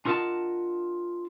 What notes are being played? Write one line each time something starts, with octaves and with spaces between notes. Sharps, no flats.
D4 F4 A#4 D#5 F#5 A5